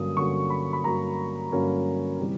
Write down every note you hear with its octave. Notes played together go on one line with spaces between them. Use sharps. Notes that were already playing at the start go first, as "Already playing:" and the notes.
Already playing: G2 D3 F#3 A#3 C#4 D#6
G2 D3 F#3 A#3 C#4 C#6
B5
B5
G2 D3 F#3 A#3 C#4 A#5
G2 D3 F#3 A#3 C#4
C3 E3 G3